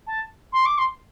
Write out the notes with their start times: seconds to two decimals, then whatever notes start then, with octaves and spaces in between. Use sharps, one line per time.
0.07 A5
0.52 C6
0.65 D6
0.78 C6